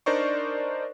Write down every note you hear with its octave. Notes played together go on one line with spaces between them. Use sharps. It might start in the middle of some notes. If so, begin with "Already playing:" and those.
D4 D#4 A#4 C5 D5 C#6